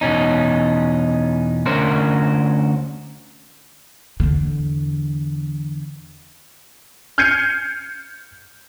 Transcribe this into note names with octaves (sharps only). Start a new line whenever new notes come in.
E2 B2 C#4 D#4
D2 C#4 A#4 C5
E2 D3
F6 G6 G#6 C7 C#7 D#7